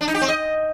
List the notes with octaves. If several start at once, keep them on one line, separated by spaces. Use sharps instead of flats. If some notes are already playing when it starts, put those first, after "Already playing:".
D4
D#4
G4
C4
D#5